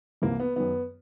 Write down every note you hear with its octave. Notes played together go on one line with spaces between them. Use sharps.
C2 C3 E3 A#3
B3
F#2 D#3 B3